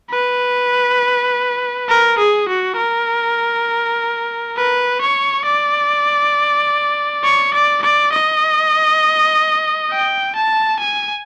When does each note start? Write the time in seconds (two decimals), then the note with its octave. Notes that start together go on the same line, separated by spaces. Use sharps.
0.11 B4
1.89 A#4
2.19 G#4
2.48 F#4
2.78 A#4
4.57 B4
5.01 C#5
5.45 D5
7.24 C#5
7.54 D5
7.83 D5
8.13 D#5
9.91 G5
10.35 A5
10.79 G#5